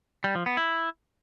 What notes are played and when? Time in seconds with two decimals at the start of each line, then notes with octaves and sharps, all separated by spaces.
0.24 G3
0.35 F3
0.46 B3
0.57 E4